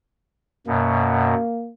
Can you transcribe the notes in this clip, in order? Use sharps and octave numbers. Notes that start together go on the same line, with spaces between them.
F#2 B2 A#3